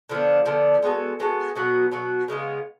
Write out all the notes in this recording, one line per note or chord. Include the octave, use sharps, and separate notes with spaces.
D3 F3 B3 D4
D3 F3 B3 D4
G#3 B3 F#4 A4
G#3 B3 F#4 A4
B2 F#3 B3 F#4
B2 F#3 B3 F#4
C#3 G#3 B3 F4